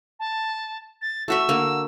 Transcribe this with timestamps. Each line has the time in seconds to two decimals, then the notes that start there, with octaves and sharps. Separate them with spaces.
0.19 A5
1.02 A6
1.28 A3 F#4 E5 E6
1.49 D3 A#3